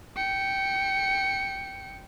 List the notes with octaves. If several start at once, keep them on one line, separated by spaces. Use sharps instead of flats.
G5 C#7